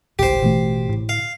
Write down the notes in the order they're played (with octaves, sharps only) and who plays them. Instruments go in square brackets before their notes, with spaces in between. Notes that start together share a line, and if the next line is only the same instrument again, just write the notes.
[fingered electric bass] G#1 C#2 A2 [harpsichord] G4 C5
[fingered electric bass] A1 E3 A3 [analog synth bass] B2
[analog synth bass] A2
[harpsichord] F5